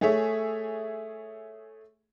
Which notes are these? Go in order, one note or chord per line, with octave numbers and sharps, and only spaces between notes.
A3 G#4 C#5 E5